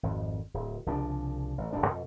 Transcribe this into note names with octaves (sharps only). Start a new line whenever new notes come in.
G#1 F2
D1
C2 C#3 F3 D4
A1
D1 A#1 G3 D4
F2 B2